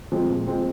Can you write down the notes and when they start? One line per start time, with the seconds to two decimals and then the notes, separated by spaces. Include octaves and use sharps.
0.12 F3 G#3 C4
0.29 A#2
0.47 F3 G#3 C4